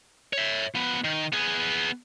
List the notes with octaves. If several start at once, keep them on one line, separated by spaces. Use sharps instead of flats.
C#5 E5
F3 B3
D#3
B3 G#4